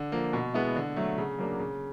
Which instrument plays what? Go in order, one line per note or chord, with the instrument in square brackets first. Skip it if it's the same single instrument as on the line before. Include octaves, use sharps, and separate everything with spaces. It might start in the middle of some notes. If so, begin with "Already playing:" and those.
Already playing: [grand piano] D3
F3 A#3
B2
G#3 B3 E4
D3
F#3 A3
C#3
F#3 A#3 D4
C#3